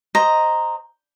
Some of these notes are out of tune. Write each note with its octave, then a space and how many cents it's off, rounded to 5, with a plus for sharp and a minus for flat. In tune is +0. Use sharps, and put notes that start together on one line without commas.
C5 +0 D#5 +0 A#5 +0